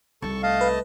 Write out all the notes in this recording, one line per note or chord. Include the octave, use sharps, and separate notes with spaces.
C2 D#4 A4 A5 C#6
A3 D#5 F5 A5
B4